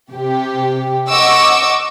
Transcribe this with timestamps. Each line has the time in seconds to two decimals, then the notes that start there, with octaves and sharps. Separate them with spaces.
0.11 C3 G4
1.09 D#5 F#5 C#6 D6 E6